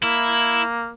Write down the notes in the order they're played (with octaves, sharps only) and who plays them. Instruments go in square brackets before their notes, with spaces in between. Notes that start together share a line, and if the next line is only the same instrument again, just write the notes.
[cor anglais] A#3 [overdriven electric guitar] E4